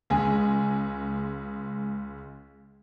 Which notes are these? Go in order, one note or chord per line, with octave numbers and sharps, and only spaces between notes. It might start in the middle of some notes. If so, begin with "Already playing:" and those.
C#2 G#3 G#5